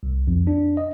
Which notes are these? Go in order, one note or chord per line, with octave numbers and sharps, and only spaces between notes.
C2
F2
D4
D#5